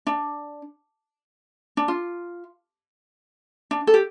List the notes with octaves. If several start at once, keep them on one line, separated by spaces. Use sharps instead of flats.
D4
D4
F4
D4
A4
G4